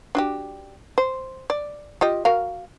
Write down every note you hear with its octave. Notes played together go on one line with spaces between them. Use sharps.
D4 F#4 G4
C5
D5
F4 G4 D#5
F#4 A#4 F5